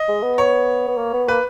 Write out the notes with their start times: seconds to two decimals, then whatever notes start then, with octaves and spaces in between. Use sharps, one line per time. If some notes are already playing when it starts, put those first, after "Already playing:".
Already playing: D#5
0.08 G#3
0.23 B3
0.38 C#5
0.88 B3
0.97 A#3
1.13 B3
1.28 A#3 B4